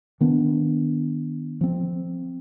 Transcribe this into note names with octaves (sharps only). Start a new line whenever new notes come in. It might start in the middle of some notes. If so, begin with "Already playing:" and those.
D#3 B3 D4
F3 C4